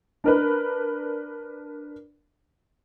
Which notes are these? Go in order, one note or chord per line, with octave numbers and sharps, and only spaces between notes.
D4 A#4 B4